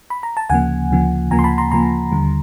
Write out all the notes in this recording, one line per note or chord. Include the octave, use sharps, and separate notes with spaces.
B5
A#5
A5
D2 C#3 F3 A#3 F#5 G#5
D2 C#3 F3 A#3
D2 C#3 F3 A#3 G#5 A#5
C6
A5 B5
A#5 C6
D2 C#3 F3 A#3 A#5 C6
D#2 D3 G3